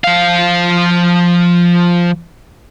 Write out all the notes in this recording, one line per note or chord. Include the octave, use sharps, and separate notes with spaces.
F3 F5